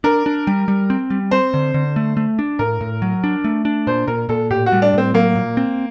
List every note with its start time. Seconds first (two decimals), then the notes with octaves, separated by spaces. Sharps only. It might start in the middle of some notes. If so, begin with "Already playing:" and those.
0.04 D4 A#4
0.26 D4
0.47 G3
0.68 G3
0.90 C4
1.10 G3
1.31 C4 C5
1.54 D3
1.74 D3
1.96 A3
2.17 A3
2.39 D4
2.59 A2 A#4
2.81 A2
3.02 F#3
3.24 D4
3.44 A3
3.65 D4
3.87 A#2 C5
4.07 A#2 A#4
4.29 A#2 A4
4.50 A2 G4
4.66 F#4
4.72 G3
4.82 D4
4.93 A2 C4
5.14 F#3 A#3
5.36 A#2
5.57 C4